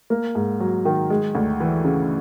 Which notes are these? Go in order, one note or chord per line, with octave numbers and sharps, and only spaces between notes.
A#3
G#2
F#3
D#3
G#3
D2
E3
C#3